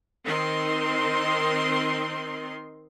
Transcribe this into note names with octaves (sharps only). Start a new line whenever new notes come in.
D#3 C4 D#4 C6